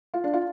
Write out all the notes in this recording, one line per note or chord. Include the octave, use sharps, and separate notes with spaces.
F4
D4
F4